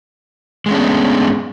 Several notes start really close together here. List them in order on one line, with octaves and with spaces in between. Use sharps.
G#3 A3 C#4 D4 B3